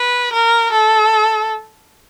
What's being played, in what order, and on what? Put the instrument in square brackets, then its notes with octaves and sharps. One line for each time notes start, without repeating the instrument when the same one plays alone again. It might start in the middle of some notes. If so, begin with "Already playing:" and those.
Already playing: [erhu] B4
A#4
A4